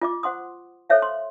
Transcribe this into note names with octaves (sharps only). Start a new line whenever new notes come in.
F4 D#5 D6
C5 F#5 C6 D#6
A4 C5 C#5 E5 F5
C6